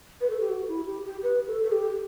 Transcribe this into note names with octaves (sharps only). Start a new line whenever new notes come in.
B4
A4
G4
F#4
E4
G4
G4
B4
A4
A4
G4